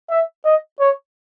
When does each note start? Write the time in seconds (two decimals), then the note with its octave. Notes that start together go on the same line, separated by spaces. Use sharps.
0.10 E5
0.45 D#5
0.80 C#5